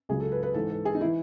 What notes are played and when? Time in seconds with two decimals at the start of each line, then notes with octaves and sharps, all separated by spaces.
0.09 C#2 C#3 F#3 G#4
0.20 A4
0.32 B4
0.43 B4
0.54 G#2 E3 A4
0.70 A4
0.85 G#4
0.95 D#4
1.01 E3 E4